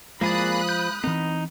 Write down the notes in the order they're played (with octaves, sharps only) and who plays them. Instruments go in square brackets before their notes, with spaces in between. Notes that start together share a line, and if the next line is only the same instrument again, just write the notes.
[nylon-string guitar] F3 [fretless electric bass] G#3 [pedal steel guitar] A#3 G#4 D5 [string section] B5 D#6 F#6
[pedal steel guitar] G6
[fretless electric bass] E3 C4 [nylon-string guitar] B3 [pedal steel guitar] D#4